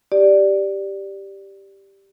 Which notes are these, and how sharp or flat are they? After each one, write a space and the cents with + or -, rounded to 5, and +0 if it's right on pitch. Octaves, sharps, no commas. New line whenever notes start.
G4 +0 D5 +0